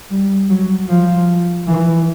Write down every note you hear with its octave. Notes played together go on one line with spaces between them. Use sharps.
G3
F#3
F3
E3